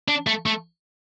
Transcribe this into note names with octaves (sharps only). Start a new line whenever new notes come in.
D4
A3
A3